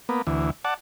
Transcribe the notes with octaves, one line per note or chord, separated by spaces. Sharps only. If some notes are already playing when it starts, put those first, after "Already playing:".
A#3 B3
D2 E3
D5 F#5 A5